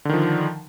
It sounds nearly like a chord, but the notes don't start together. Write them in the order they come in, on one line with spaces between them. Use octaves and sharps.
D3 D#3 F3